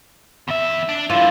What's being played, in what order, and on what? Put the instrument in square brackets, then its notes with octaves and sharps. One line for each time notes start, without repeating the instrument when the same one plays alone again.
[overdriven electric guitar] E2 E5
D4
[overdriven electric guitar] D3 E3 [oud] F4